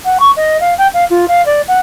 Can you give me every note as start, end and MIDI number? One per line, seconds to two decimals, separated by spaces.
0.04 0.17 78
0.19 0.30 85
0.36 0.59 75
0.60 0.74 77
0.77 0.87 79
0.93 1.04 77
1.10 1.27 65
1.27 1.44 77
1.45 1.61 74
1.67 1.80 78